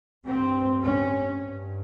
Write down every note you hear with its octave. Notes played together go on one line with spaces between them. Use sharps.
G2 C4
C#4
G2